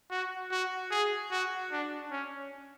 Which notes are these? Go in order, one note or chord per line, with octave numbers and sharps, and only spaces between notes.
F#4
F#4
G#4
F#4
D4
C#4